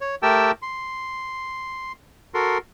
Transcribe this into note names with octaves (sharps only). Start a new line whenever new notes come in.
C#5
A3 G4 A#4 G5 A5 E6
C6
F#4 A4 A#4 C6